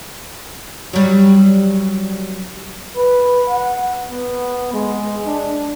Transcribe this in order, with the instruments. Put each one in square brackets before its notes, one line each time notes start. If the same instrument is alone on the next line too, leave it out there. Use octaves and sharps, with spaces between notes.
[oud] F#3 G3
[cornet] B4
F#5
B3
G#3
D4